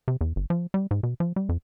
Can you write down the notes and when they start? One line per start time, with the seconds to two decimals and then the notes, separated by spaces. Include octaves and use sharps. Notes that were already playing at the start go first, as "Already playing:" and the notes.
0.08 C3
0.21 E2
0.36 G1
0.50 F3
0.74 G3
0.91 G#2
1.03 B2
1.20 F3
1.36 G3
1.49 F2